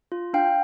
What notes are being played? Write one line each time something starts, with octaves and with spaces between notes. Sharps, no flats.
F4
D4 F5 G5